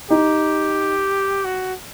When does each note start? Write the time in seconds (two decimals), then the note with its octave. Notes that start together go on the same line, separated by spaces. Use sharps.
0.10 D#4 G4
1.45 F#4